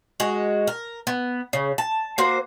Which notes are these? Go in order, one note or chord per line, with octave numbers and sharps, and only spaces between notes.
G#3 F#4
A#4
B3
C#3
A5
A#3 F#4 C5